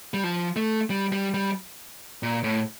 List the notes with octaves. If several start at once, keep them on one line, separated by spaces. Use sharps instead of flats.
G3
F3
A3
G3
G3
G3
A#2
A2